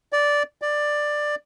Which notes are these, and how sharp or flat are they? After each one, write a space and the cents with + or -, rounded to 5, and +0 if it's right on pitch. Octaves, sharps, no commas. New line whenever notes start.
D5 -10
D5 +10